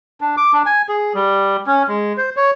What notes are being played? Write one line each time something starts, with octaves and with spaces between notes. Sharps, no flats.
D4
D6
D4
G#5
G#4
G3
C#4
G#3
C5
C#5